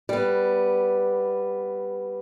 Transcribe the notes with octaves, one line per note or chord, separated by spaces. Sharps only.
G3 B3